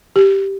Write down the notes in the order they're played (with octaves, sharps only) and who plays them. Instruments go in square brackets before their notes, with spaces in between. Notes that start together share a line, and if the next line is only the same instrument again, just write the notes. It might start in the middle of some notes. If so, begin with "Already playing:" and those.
[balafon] G4